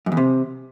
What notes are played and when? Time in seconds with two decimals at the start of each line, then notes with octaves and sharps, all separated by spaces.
0.06 F#2
0.12 E2
0.17 C3